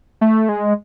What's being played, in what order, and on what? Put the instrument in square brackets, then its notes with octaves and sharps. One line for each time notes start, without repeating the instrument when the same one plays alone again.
[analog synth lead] A3
G#3